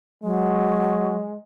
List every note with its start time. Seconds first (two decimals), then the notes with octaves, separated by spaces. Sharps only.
0.24 F#3 G#3